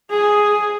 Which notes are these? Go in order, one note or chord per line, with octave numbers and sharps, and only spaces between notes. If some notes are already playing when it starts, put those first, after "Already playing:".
G#4